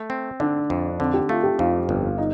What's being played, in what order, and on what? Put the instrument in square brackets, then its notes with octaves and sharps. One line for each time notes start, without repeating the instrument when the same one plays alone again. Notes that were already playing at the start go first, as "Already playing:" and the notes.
Already playing: [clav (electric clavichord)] A3
C4
[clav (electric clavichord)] D3 [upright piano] D4
[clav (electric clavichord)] F2
[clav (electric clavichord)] D3 [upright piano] C4
[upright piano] G4
[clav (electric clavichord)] A3 [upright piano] F4
[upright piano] G4
[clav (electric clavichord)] F2 [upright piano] F4
[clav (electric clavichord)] G1
[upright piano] D#4